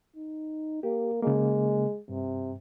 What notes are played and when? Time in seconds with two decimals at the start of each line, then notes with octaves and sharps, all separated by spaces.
0.16 D#4
0.83 A#3 G4
1.22 C#3 G#3 A#3
2.09 G2 C3